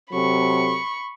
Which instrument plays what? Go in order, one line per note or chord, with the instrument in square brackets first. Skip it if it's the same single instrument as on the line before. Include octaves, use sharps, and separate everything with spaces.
[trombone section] C3 F#3 A4 [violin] B5 C#6